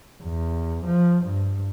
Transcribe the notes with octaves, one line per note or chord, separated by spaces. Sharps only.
E2
F3
G2